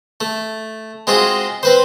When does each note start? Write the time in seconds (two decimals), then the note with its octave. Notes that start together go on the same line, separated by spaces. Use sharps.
0.21 A3
1.07 G#3 C4 F4 F#4 G#4
1.63 C4 B4 C5